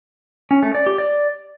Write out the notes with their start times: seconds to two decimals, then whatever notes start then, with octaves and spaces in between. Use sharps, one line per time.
0.51 C#4
0.63 A3
0.75 D5
0.86 G4
0.98 D5